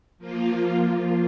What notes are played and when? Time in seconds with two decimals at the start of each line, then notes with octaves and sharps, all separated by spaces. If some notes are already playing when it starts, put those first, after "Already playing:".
0.18 F3 A#3 F4